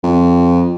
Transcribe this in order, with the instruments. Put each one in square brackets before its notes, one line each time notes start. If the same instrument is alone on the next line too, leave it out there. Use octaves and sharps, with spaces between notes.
[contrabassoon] F2